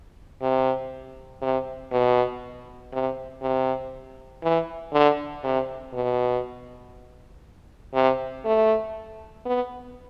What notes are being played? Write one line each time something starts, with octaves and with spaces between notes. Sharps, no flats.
C3
C3
B2
C3
C3
E3
D3
C3
B2
C3
A3
B3